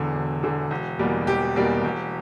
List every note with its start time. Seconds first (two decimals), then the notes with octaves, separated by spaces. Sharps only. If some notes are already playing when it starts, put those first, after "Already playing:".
Already playing: E1 E2 D3
0.14 E1
0.43 E2 D3
0.71 E1
0.99 E2 B2 G3 A#3
1.27 E1 G4
1.56 E2 B2 G3 A#3
1.84 E1